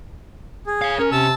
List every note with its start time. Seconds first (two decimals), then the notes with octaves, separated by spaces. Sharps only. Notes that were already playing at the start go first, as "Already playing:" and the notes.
0.67 G#4
0.82 C#5 F5
0.99 C#4 A#4
1.12 C3 A5 E6